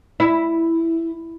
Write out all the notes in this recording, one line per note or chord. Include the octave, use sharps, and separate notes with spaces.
E4